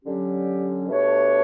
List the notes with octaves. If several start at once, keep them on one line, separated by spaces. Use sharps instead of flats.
D3 F#3 C#4 G4
B2 A3 D4 G4 C#5